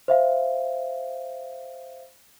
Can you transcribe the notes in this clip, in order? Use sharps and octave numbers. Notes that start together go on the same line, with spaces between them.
C5 E5 F5